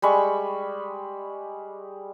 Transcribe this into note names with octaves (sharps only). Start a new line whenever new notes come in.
G3 G#3 B5 C#6